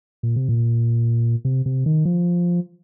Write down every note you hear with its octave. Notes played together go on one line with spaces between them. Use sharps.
A#2
C3
A#2
C3
C3
D#3
F3